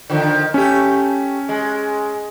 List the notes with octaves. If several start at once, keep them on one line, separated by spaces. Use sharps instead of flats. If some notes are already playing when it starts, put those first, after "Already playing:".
D3 D#3 F3
A3 C#4 G4
G#3